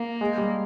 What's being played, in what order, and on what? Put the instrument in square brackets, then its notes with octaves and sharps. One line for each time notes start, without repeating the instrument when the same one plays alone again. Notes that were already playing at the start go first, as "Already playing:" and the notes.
Already playing: [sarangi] A#3
[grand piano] G#3
G3